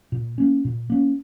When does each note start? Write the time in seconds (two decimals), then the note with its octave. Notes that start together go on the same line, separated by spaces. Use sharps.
0.12 A#2
0.38 A#3 C#4
0.65 A#2
0.90 A#3 C#4